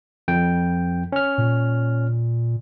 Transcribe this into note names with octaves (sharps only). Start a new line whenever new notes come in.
F2 G5
C#4 F6
A#2